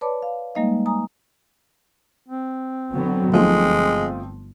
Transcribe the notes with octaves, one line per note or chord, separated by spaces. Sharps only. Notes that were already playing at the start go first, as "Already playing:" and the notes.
B4 C#5 D5 A5 B5 D6
F5
G3 G#3 A#3 D#4 D#5 F5
G#5 A#5 D#6
C4
D3 F#3 B3
G1 F3 G#3 A3 D#4